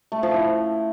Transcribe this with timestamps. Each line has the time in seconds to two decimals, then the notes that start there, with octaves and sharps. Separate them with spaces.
0.12 A3
0.23 F3
0.34 E4